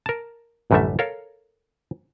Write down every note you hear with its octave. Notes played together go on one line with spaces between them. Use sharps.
A#4 A5
A1 F#2 D3 G3 A3 E5
A4 A#4 C#5 F5